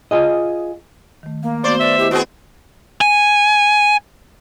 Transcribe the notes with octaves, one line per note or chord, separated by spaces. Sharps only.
F4 G#4 D#5
D#3 A3
A#3 F5
A3 B3 F#4 C5 D5
A3 B4 D5 E5
E4 G4 D#5
B3 C4 F#4 G#4
G#5